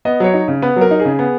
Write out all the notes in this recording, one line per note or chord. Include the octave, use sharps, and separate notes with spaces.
B3 D#5
F#3 C#5
D#4
C#3
B3 B4
F#3
A#4
D#4
G#4
C#3
B3